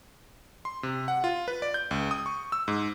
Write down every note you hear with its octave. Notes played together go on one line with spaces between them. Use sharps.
C6
C3
F#5
F4
B4
D5
G6
C#2
D#6
C#6
E6
G#2